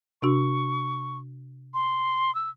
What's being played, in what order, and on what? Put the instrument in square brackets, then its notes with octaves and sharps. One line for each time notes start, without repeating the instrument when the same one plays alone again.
[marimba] C3 D4 F#4 [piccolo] C#6
[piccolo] C6
E6